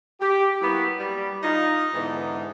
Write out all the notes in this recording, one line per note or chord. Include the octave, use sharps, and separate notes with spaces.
G4
F#3 A#3 B3 E4 F#4 G4
G3
D#4 F4
G#2 D3 E3 B3 D4 D#4